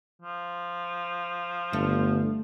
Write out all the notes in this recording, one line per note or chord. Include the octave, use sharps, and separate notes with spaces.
F3
G1 A3